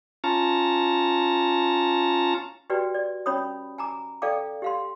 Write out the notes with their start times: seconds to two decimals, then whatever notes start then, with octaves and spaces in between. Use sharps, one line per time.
0.24 C#4 F4 A5 A#5
2.70 F#4 G4 B4 D5 G5
2.95 D5
3.26 C#4 C#5 B5 D#6
3.78 G#5 A#5 D6
4.22 A4 D5 F5 G5 D6
4.62 G4 F5 C6